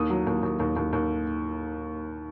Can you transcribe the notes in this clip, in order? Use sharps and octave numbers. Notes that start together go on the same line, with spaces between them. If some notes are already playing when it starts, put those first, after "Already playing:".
Already playing: D#2 D#6
F#3
D#2
D#2
D#2
D#2
D#2